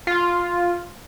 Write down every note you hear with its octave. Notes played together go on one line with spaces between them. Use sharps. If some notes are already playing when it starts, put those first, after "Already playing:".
F4